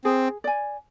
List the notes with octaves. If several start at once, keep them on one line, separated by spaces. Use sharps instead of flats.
C4 G#4
D5 G#5